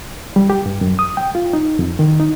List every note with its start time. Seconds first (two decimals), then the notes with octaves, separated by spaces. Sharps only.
0.36 G3
0.50 G4
0.66 G2
0.81 F#2
0.99 D#6
1.17 G5
1.35 F4
1.53 D#4
1.79 F2
1.99 D#3
2.20 D#4